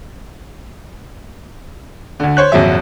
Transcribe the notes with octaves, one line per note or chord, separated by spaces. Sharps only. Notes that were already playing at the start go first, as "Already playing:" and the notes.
D2 D3
C5 C#5 F#6
G#1 F2 A#2 F#3 E5